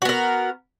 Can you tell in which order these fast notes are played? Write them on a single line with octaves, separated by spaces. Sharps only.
F#4 B3 A#4